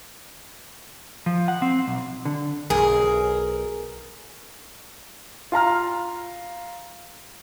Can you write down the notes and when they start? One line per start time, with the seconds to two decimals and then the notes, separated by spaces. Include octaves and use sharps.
1.26 F3
1.48 F#5
1.62 C4
1.87 B1
2.25 D3
2.70 B1 G#4 A#4
5.52 F4 F5 A#5 F6